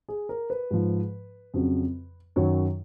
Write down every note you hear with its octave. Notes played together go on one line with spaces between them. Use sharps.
G#4
A#4
B4
G#2 F3
F2 C#3 F#3
F#2 D#3 F#3 C#5